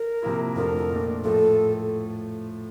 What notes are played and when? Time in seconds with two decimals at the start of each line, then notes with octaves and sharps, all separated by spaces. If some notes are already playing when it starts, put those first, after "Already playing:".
Already playing: A#4
0.22 C3 F3 A#3 E4
0.55 F2 D3 F3 A3 A#4
0.90 A#2 A3 D4
1.24 A2 F3 A3 A4